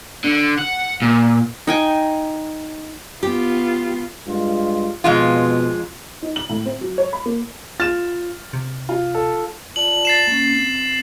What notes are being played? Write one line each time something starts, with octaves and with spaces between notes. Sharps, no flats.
D3
F#5
A#2
D#4 G5 G#5
B3 F4 G4
G2 G#3 F4
F2 B2 G#3 F4
D#4
F#7
A2
C4
F#3
C#5
B5
A#3
F4 F6 A6 E7
C3
F4
A4
F4 D5 A5 F#7
A6 C7 E7
A#3 C#4
C4